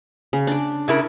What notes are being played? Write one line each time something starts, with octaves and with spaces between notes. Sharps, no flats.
C#3
D4 D6
C#3 E4 A#4